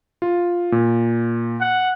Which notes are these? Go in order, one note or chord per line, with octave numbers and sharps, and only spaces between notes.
F4
A#2
F#5